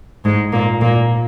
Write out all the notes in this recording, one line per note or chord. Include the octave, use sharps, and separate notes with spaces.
G#2 G#3
A#2 A#3
A#2 A#3